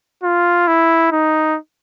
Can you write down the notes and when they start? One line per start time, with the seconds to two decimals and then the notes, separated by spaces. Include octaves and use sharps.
0.23 F4
0.68 E4
1.11 D#4